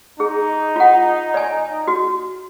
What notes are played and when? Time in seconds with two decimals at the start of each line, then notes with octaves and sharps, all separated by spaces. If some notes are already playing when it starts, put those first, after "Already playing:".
0.20 D#4 G#4
0.76 F4 F#5
1.34 D5 G#5
1.88 F#4